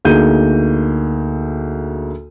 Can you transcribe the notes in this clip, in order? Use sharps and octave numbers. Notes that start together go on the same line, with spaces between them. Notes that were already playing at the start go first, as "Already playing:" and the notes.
D2 A#3 D#4 G#4 G6 D#7